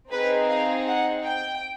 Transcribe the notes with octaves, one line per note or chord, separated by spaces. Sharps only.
C4 D#4 G#4 B4
F5
F#5
G5